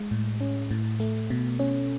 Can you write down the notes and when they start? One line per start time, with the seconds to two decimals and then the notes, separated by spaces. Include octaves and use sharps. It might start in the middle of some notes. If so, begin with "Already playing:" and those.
Already playing: G#3
0.11 A2
0.41 C#4
0.71 A2
1.00 A3
1.30 B2
1.59 C#4